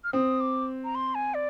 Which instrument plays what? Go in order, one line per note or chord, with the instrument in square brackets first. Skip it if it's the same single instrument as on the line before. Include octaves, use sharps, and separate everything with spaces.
[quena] F6
[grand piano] C4 [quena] D#6
[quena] D6
A#5
C6
G#5
D5